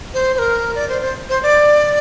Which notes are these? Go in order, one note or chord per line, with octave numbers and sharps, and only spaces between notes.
C5
C5
A#4
D5
C5
C5
C5
D5